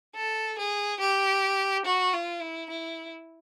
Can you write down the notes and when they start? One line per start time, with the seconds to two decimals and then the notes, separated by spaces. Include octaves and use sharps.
0.15 A4
0.58 G#4
1.00 G4
1.85 F#4
2.13 F4
2.41 E4
2.71 E4